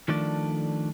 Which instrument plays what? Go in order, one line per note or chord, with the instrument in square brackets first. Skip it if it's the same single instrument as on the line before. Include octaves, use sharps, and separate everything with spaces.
[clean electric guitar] D#3 F3 A3 D4 A4 D5